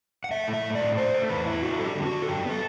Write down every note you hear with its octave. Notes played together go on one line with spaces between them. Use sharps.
F#5
A3 E5
A2
E5
A3
A2 D5
A3 C5
A3
E2 B4
E4
D4 F#4
G3 A4
G4
D3
G4
F#4
D3
A4
F#2 G4
B3 A4